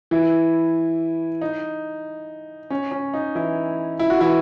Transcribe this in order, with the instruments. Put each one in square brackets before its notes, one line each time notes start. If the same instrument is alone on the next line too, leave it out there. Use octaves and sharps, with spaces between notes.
[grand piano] E3 E4
D#4
C#4
C#4
D#4
E3 E4
E4
F#4
E3 E4